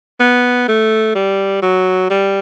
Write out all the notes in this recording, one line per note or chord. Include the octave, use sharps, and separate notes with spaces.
B3
A3
G3
F#3
G3